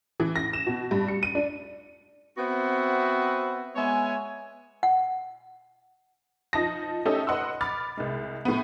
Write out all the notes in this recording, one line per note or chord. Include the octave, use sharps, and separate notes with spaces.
E3
A#6
E7
B2
G2
C#7
D#7
D4
B3 C4 F#4 C5 E5 F#5
G#3 B3 C#5 E5 G#5
F#5
F3 D#4 A5 A#6
A3 C#4 D#4 G4 A4 E5
B4 D#5 F#5 C6 E6
B5 D6 F6 A6
C2 G#3
A2 B3